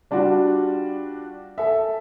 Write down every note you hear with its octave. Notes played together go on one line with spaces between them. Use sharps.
G3 D4 F4 F#4
A4 E5